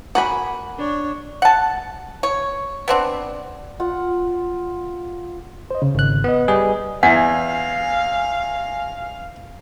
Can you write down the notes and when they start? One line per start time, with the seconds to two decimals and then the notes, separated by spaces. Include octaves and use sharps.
0.15 A#3 F#4 G#5 B5
0.78 D4 C#5
1.42 F#5 A5
2.23 C#5
2.88 B3 C4 D4
3.80 F4 F#5
5.71 C5 D#5
5.82 C#3
5.95 G#1 F#6
6.24 B3 B4 D#5
6.48 G3 G#4
7.03 E2 F5 F#5 G#5